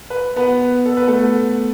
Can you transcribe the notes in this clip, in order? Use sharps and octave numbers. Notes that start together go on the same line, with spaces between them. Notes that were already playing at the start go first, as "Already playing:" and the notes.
B4
B3 B4
A4
B4
A3 A4